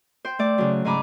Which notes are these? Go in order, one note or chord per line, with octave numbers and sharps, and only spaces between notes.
C5 G5
A3 D5
C#3 F#3
G#2 C#3 G#5 A#5 B5 D6